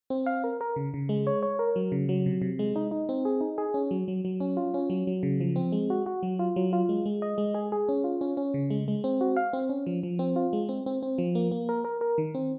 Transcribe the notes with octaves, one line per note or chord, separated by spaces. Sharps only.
C4
F5
A#4
A#4
C#3
C#3
G#3
C#5
C#5
A#4
F#3
C#3
F#3
C3
C3
G#3
D#4
D#4
C4
G#4
D#4
G#4
C#4
F#3
F#3
F#3
C#4
F4
C#4
F#3
F#3
C#3
F3
C4
G#3
F#4
F#4
F#3
F4
F#3
F4
G#3
G#3
D#5
G#3
G#4
G#4
C#4
F4
C#4
C#4
C#3
G#3
G#3
C4
F#4
F5
C4
C#4
F3
F3
C4
F4
G#3
C4
C4
C4
F3
A#3
A#3
A#4
A#4
A#4
D#3
C4